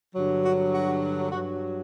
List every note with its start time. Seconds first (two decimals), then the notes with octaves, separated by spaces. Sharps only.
0.15 G2 D3 F#3
0.45 F#4
0.74 F#4
1.32 G2 F#3 F#4